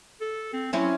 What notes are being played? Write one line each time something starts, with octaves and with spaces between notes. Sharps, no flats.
A4
C4
F#3 C4 C#4 E4